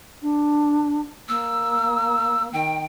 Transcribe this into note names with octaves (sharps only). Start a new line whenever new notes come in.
D4
A#3 E6
D#3 G5